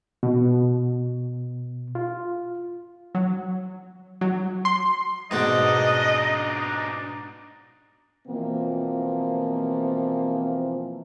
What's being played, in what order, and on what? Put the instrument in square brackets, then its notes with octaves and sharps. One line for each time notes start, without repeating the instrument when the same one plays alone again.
[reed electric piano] B2
F4
[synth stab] F#3
F#3
C6
[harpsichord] G#2 B2 G#3 [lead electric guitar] D4 D#4 [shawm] D#5
[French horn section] B2 E3 F3 A#3 C4